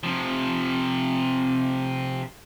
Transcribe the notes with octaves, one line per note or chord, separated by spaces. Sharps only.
C3 F3